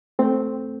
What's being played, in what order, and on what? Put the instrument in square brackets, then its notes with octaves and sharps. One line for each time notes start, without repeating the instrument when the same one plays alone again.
[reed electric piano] A3 C4